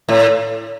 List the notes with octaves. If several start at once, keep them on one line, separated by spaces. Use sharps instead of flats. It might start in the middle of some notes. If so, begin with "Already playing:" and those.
A2